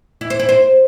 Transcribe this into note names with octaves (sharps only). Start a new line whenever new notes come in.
E4
C5
E4
C5